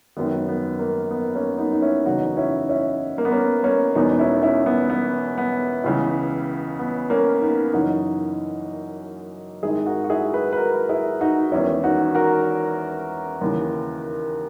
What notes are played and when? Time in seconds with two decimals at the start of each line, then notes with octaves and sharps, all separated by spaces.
0.17 G#1 F#2 D#3 B3
0.49 B3
0.79 A#3
1.11 B3
1.35 A#3 C#4
1.58 B3 D#4
1.72 D#4
1.82 C#4 E4
2.06 F#1 E2 C#3 D#4 F#4
2.37 C#4 E4
2.69 C#4 E4
3.18 A#3
3.25 B3
3.32 A#3 C#4
3.64 A#3 C#4
3.95 E1 E2 B2 B3 D#4
4.19 C#4 E4
4.42 C#4 E4
4.66 B3
4.90 B3
5.38 B3
5.84 C#2 C#3 E3
6.79 B3
7.10 A#3 C#4
7.41 B3 D#4
7.73 F#1 F#2 E3 D#4 F#4
9.63 G#1 G#2 D#3 E4 G#4
9.86 F#4 A#4
10.04 F#4
10.10 E4 G#4
10.34 G#4 B4
10.53 B4
10.57 F#4 A#4
10.89 E4 G#4
11.21 D#4 F#4
11.52 E1 E2 D#3 C#4 E4
11.84 D#4 F#4
12.15 F#4 A#4
13.41 D#2 C#3 E3